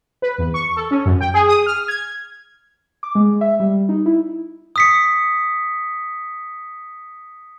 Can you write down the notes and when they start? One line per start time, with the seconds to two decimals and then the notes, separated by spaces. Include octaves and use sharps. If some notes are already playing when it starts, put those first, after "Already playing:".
0.22 B4
0.38 E2
0.54 C#6
0.76 A4
0.91 C#4
1.06 F#2
1.21 G5
1.34 G#4
1.48 D#6
1.66 F6
1.88 G#6
3.03 D6
3.15 G#3
3.41 E5
3.60 G3
3.89 D#4
4.06 E4
4.76 D#6 B6 C#7